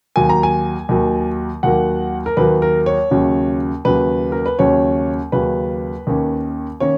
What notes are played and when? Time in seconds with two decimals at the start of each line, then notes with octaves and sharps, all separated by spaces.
0.16 D#2 D#3 F#3 A#3 G#5
0.29 A#5
0.43 G#5
0.89 D#2 D#3 F#3 A#3
1.63 D#2 D#3 F#3 A#3 F#5
2.26 A#4
2.37 D#2 D#3 F#3 A#3 B4
2.62 A#4
2.86 C#5
3.11 D#2 C#3 F#3 C#4
3.85 D#2 C#3 F#3 C#4 B4
4.32 A#4
4.46 B4
4.59 D#2 C#3 F#3 C#4 C#5
5.32 D#2 C#3 F#3 C#4 B4
6.07 D#2 D#3 A#3 C#4
6.80 D#3 A#3 C#4 C#5